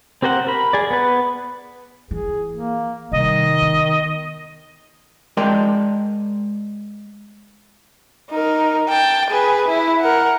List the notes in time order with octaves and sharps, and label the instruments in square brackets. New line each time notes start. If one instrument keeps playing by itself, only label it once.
[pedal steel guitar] C4 G4 A#4 C5 F#5
A#4 B5
G#4 D5
B3 B4
[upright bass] E3 [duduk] G#4
[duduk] A#3
[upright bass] C3 G3 [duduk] D#3 [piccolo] D#5
[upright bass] B3
[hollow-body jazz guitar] G#3 A#4 D5 D#5 G5 C6
[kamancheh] D#4 A#4
G5 A5
G#4 B4
E4
A#4 F#5